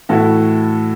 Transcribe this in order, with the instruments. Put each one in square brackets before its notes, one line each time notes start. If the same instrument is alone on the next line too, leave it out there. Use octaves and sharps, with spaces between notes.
[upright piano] A2 E3 A3 E4 F#4 A4